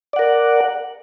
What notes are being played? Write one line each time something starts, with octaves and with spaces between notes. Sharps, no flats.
A#4 D5 F#5